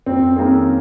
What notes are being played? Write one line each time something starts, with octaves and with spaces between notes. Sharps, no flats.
F2 C4
D#3 A#3 C4 C#4 G#4